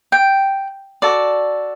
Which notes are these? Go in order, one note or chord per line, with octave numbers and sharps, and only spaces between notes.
G5
F#4 A4 D5